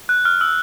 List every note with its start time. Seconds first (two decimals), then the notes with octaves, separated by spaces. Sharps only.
0.09 F#6
0.25 F6
0.41 E6